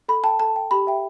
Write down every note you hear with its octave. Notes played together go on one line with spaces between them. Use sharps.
A4 B5
G5 A5
A4 A5
G5
G4 B5
E5 G5